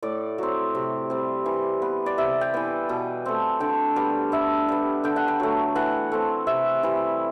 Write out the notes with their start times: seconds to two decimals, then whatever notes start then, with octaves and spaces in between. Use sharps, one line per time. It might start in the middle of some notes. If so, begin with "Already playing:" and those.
0.03 A2 D5
0.38 F#3 C4
0.75 C3
1.10 G3 C4
1.46 E3
1.82 B3
2.06 D5
2.18 C3 E5
2.41 G5
2.54 E3 B3
2.89 B2
3.26 A3 C4
3.60 D3 G5
3.96 G3 B3
4.32 D3 E5
4.68 G3 B3
5.04 D3 G5
5.16 F#5
5.28 G5
5.40 F#3 A3
5.75 E3 F#5
6.12 A3 C4
6.47 C3 E5
6.83 E3 G3